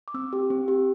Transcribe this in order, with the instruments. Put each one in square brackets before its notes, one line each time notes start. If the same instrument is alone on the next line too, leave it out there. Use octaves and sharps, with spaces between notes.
[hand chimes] D6
C4 E6
G4
C4
G4